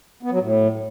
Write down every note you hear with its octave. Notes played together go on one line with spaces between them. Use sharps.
B3
F#3
A2